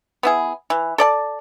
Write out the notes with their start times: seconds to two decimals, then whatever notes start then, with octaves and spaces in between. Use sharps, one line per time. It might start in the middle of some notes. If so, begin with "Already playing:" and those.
0.23 B3 E4 G#4
0.70 E3
0.98 A4 D5 A5